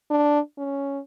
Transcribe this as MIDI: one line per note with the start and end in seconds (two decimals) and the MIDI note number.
0.11 0.39 62
0.58 0.99 61